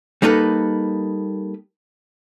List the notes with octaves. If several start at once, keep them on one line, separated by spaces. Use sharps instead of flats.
G3 A#3 D#4 A4 B4